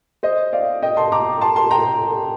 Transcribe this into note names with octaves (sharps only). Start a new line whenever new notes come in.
C5 D#5
D5 F5
D#5 G5
A5 C6
A#5 D6
A5 C6
A5 C6
G5 A#5